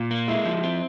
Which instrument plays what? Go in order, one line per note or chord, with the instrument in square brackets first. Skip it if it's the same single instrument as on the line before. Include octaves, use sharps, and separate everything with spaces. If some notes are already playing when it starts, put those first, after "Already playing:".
Already playing: [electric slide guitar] A#2 [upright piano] F4
[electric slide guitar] A#3
[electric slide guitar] G#3 [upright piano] E4
[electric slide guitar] F3
C4